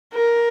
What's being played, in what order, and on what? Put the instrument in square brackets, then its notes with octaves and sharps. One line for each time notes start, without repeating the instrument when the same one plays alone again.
[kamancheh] A#4